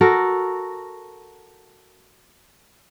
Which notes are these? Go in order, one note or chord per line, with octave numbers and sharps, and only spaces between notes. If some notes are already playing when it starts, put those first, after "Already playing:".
F#4 A4 A#4